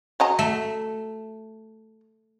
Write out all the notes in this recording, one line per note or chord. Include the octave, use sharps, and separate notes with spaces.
F#3 D#5 A#5
A3